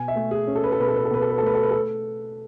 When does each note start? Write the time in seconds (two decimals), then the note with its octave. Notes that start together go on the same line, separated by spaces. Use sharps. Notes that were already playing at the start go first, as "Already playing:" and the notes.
Already playing: B2 G#5
0.08 E5
0.15 A3
0.31 G#4
0.47 C#4
0.55 A4
0.64 B4
0.72 A4
0.79 B2 B4
0.88 A4
0.96 B4
1.05 A4
1.11 B2 B4
1.22 A4
1.30 B4
1.38 A4
1.42 A3 B4
1.55 A4
1.63 B4
1.71 A4